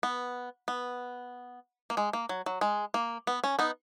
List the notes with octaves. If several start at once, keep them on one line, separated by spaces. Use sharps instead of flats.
B3
B3
A#3
G#3
A#3
F#3
F#3
G#3
A#3
B3
C#4
B3 D#4